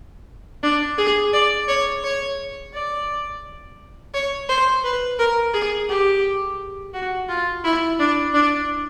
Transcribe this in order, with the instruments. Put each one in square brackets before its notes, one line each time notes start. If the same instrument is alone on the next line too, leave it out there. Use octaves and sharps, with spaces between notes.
[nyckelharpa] D4
G#4
D5
C#5
C#5
D5
C#5
C5
B4
A#4
G#4
G4
F#4
F4
E4
D4
D4